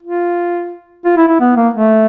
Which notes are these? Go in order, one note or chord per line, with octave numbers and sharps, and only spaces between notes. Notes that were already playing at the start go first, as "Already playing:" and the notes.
F4
F4
E4
E4
B3
A#3
A3